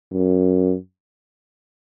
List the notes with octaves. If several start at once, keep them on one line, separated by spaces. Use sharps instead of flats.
F#2